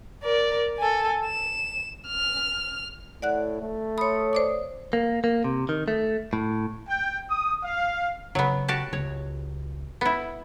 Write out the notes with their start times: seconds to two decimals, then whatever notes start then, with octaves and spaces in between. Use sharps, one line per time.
0.24 A#4 D5
0.78 A4 G#5
1.25 E7
2.07 F6
3.22 A2 D5 F#5 F#6
3.61 A3
3.98 C#5 B5 C6 D#6
4.33 C5 D5 D6
4.93 A#3
5.24 A#3
5.44 C3
5.69 D#3
5.88 A3
6.33 A2
6.88 G5
7.30 D#6
7.63 F5
8.35 C#3 F#3 B3
8.68 F#4 G4 A5
8.93 C#2 C#5
10.01 B3 E4